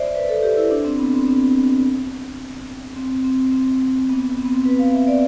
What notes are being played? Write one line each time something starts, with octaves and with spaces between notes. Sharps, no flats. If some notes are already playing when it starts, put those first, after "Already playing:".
Already playing: C5 D5 E5
B4
A4
G4
E4
D4
C4
B3
C4
C4
C4
C4
C4
B3
C4
B3
C4
B4
F5
E5
D5